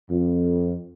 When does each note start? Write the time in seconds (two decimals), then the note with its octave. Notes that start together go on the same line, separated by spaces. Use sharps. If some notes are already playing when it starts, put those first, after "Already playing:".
0.10 F2